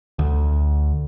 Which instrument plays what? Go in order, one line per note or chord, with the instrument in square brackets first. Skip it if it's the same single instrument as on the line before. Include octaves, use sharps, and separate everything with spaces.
[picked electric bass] D2